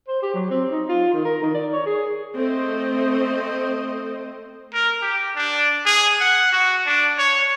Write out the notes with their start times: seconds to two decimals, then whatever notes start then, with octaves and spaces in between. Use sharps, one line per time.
0.08 C5
0.22 G4
0.34 F#3
0.50 C4
0.71 D#4
0.89 F4
1.13 D#3
1.25 A#4
1.43 D#3
1.54 D5
1.73 C#5
1.86 G#4
2.35 A3 C4 C5 D#5
4.74 A#4
5.02 G4
5.36 D4
5.86 G#4
6.20 F#5
6.53 F#4
6.86 D4
7.18 C#5